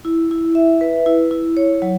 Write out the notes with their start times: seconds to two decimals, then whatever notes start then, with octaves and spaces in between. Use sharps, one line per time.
0.05 E4
0.31 E4
0.55 E5
0.81 B4
1.06 E4
1.31 E4
1.57 C#5
1.82 F#3